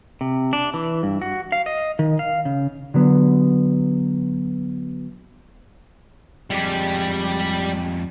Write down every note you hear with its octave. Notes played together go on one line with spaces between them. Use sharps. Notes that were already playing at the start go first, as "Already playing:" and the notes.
C3
D4
E3
G2
F#4
F5
D#5
D#3
F5
C#3
D3 F#3 B3
F2 G3 G#3 G4